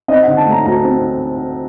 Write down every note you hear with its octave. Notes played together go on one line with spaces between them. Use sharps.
C4 D#5
D3 F#5
A5
A3 A#5
D2 A#5
C4